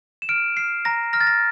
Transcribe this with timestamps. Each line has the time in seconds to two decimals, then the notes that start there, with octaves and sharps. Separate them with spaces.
0.22 E7
0.29 F6 D7
0.57 F6 C7
0.85 A#5 A#6
1.13 F6 A#6
1.21 A6
1.27 A#6